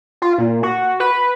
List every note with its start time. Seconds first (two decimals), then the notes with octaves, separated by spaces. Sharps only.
0.22 F4
0.38 A#2
0.63 F#4
1.00 B4